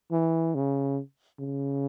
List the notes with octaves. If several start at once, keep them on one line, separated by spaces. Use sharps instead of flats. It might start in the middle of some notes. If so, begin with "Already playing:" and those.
E3
C#3
C#3